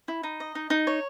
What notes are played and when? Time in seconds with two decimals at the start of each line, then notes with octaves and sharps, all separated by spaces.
0.08 E4
0.23 D#4
0.40 D#5
0.55 D#4
0.70 D#4
0.87 C#5